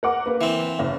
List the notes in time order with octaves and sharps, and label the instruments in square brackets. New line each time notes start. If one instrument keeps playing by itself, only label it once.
[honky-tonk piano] A#4 F#5 D6
A#3 B4
[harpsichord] E3 C4
[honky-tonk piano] F#1